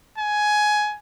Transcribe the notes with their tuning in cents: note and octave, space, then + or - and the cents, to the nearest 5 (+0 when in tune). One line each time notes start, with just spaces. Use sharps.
G#5 +15